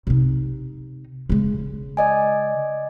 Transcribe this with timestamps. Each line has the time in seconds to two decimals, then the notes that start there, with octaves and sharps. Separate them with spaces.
0.07 C3 D#4
1.29 C#3 G#3
1.97 D5 D#5 G#5